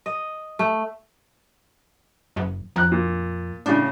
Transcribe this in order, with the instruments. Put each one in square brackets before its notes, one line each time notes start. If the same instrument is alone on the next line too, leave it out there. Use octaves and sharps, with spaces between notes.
[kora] D#5
A3
[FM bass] F#1
[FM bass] F2 [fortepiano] A#5 F#6
[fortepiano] A#2
[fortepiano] A2 C#3 [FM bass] D4